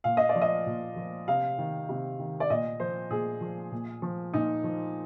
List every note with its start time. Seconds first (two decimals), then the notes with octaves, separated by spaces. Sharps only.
0.04 A#2 F5
0.17 D#5
0.29 D5
0.35 F3
0.42 D#5
0.66 A#2
0.96 F3
1.28 C3 F5
1.58 D#3
1.89 C3
2.20 D#3
2.40 D5
2.50 A#2 D#5
2.80 F3 C5
3.11 A#2 G#4
3.41 F3
3.72 A#2
4.02 F3
4.34 A#2 D#4
4.64 F3